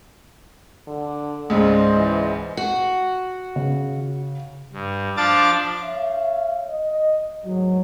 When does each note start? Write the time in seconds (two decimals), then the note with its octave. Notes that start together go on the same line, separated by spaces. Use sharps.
0.87 D3
1.50 C#2 G#2 C#3 G#3 C5 D5 D#5
1.96 E3
2.57 F#4
3.56 C#3
4.73 G2
5.17 F3 D4 F5 A5 D6 A6
5.82 C#5 E5 F5
6.70 D#5
7.45 D2 G#2 D#3 F#3